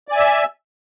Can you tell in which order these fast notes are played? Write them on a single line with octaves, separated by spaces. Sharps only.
D5 G#5 E5 E6